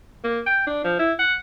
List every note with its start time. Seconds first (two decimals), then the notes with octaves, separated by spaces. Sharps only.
0.24 A#3
0.47 G5
0.67 D4
0.84 F3
0.99 E4
1.19 F#5